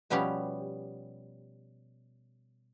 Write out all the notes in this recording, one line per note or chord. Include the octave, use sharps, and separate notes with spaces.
B2 F3 G3 B3 C#4 G4